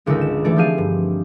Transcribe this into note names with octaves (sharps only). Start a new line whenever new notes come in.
G#1 C#2 D3 D#3 D#4 E6
E7
E3 A3 D5
F3 C4 G4 G#4 F5 D#7
G2